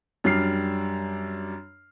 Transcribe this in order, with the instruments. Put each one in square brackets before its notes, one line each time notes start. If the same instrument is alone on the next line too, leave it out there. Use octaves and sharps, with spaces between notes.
[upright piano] F#2 G3 D4 F6 C7